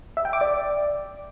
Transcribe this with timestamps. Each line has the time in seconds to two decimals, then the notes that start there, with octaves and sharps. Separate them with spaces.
0.17 E5
0.25 G5
0.33 D6
0.41 D5